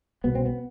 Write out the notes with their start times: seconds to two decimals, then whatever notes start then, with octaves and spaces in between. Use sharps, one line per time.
0.24 C2 B2 B3
0.35 C4
0.46 B3